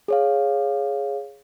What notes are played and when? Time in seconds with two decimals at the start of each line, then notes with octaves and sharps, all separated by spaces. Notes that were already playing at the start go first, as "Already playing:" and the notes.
0.08 G#4 C#5 F5